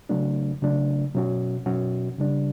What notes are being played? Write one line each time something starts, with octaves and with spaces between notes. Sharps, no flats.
C#3 F#3 A3 D4
C#3 F#3 A3 D4
B2 F#3 C#4 F#4
B2 F#3 C#4 F#4
C#3 G3 D4